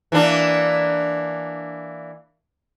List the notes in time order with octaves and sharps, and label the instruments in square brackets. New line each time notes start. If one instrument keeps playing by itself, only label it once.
[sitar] E3 A#3 D4